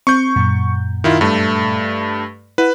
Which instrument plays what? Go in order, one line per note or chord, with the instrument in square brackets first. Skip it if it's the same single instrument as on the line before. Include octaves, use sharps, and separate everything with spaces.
[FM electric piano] C4 [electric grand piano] C#6 G6
[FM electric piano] F#2 A#2
[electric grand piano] D#3 E4 F4
G2 A3
[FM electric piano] E4 F#5 [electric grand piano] B4